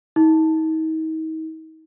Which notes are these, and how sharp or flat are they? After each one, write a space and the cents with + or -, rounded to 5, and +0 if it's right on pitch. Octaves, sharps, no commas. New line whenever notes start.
D#4 +40